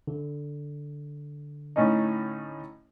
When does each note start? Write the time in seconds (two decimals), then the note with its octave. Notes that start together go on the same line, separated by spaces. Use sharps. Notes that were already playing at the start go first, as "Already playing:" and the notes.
0.07 D3
1.76 A2 C#4 D#4